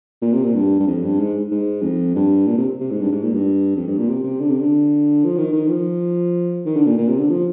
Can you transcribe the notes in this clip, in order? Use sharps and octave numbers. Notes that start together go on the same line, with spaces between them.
A#2
C3
A#2
G2
G2
F2
G2
G#2
G#2
F2
G2
A#2
C3
C3
G#2
G2
G#2
A#2
G2
F2
G2
A#2
C3
C3
D3
C3
D3
F3
D#3
D#3
F3
D#3
D3
A#2
A#2
C3
D3
F3